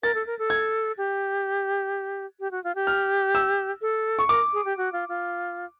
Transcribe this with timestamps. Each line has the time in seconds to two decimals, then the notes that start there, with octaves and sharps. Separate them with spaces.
0.03 A#4 A6
0.15 A4
0.27 A#4
0.39 A4
0.50 G#6
0.98 G4
2.40 G4
2.51 F#4
2.64 F4
2.75 G4
2.87 F6
3.35 E6
3.82 A4
4.19 C#6
4.29 A#4 D6
4.53 G#4
4.65 G4
4.77 F#4
4.93 F4
5.09 F4